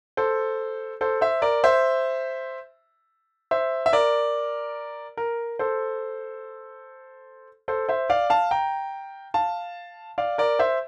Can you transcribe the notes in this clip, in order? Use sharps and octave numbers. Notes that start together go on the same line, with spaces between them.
A4 C5
A4 C5
C5 E5
A#4 D5
C5 E5
C5 E5
E5
A#4 D5
A#4
A4 C5
A4 C5
C5 E5
D5 F5
F5 A5
G5 A#5
F5 A5
D5 F5
A#4 D5
C5 E5